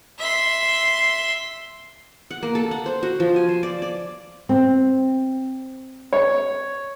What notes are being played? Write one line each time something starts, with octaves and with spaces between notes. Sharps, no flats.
E5 C6
F#5
A#3
A4
F#5
C5
F#4
F3
G#5
C5
D5
D5
C4
C#5